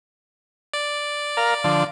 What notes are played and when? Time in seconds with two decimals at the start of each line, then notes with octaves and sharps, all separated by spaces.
0.73 D5
1.37 A#4 F5
1.64 D3 F3